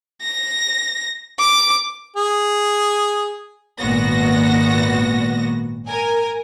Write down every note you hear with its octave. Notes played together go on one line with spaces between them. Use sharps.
A#6
D6
G#4
G#1 A#2 B3 F#4 A#6
A#4 G#5